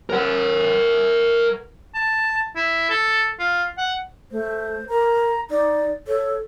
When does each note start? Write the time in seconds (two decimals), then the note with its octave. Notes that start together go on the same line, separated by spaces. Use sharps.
0.10 A#4 F#5
1.95 A5
2.56 E4
2.90 A4
3.39 F4
3.78 F#5
4.32 A3 C5
4.89 A#4 A#5
5.50 D#4 D5
6.07 A4 C#5